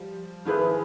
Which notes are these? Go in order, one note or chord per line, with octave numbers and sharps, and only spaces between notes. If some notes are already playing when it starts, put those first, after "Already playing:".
Already playing: F3 G3
D#3 F3 E4 G#4 B4